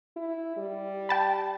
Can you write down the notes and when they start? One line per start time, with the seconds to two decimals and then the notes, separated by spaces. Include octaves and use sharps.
0.16 E4
0.57 G3
1.09 G5 A5 B5